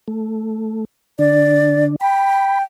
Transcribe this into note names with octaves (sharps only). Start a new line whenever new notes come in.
A3
D3 D4 D5
G5 B5